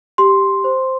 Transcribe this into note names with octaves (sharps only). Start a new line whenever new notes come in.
G4 C6
C5